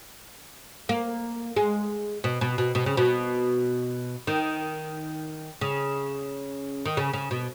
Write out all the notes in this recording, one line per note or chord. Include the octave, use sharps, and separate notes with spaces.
A#3
G#3
B2
B2
B2
B2
C#3
B2
D#3
C#3
D#3
C#3
C#3
B2